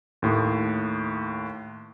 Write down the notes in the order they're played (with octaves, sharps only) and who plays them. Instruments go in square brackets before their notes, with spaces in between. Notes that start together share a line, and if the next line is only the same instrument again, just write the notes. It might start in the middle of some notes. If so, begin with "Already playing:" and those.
[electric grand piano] D#2 A2